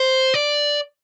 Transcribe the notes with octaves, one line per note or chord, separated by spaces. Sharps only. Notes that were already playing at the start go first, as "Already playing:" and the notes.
Already playing: C5
D5